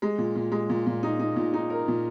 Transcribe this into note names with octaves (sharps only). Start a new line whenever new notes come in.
G#3
A#2
A#2
G#3
A#2
A#2
D#4
D#4
A#2
D#4
A#4
A#2